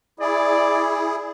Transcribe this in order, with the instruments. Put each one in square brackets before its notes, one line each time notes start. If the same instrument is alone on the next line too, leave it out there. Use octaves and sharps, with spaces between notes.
[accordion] E4 G#4 [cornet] D5